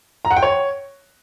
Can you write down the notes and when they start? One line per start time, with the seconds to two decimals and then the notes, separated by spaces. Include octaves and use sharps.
0.25 A#5
0.31 F#5
0.37 G5
0.42 C#5